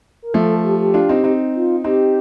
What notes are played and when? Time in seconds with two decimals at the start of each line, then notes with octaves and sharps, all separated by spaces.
0.22 A#4
0.34 F3 A3 A4
0.64 G4
0.79 G4
0.94 D4 F4
1.09 C4 D#4
1.24 C4 D#4
1.55 F4
1.84 C4 D#4 G4